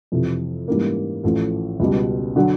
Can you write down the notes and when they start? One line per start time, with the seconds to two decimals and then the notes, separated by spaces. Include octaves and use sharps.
0.12 F2 C3 E3
0.68 G#2 E3 G3 A#3 C#4
1.23 A1 A2 F3 A3
1.80 C#2 B2 G3
2.36 D3 F#3